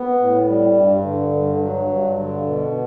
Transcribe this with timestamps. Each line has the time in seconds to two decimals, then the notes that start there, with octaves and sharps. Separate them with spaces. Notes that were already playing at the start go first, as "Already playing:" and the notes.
Already playing: B3
0.20 A2
0.47 G3
0.76 G2
1.05 D3
1.33 G2
1.61 F#3
1.89 G2
2.17 D3
2.46 B2